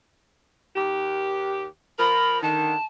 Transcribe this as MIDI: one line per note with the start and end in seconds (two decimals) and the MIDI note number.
0.76 1.66 39
0.76 1.66 67
1.99 2.42 53
1.99 2.42 70
1.99 2.41 83
2.42 2.75 50
2.42 2.75 51
2.42 2.85 81